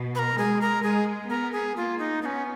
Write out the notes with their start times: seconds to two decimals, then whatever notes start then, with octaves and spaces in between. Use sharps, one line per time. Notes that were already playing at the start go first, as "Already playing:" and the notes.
Already playing: B2
0.15 B4
0.19 A#4
0.38 G#3 G#4
0.61 A#4
0.83 G#3 G#4
1.30 B3 A#4
1.52 G#4
1.76 A#3 F4
1.99 D#4
2.22 B3 D#4
2.25 C#4